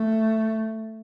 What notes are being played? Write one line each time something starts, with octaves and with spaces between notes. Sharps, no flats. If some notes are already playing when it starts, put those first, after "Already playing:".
Already playing: A3